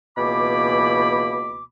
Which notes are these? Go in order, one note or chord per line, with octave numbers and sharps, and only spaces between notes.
C#2 B2 E3 A#3 B5 D6